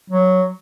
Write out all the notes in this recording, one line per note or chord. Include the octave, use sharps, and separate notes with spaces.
F#3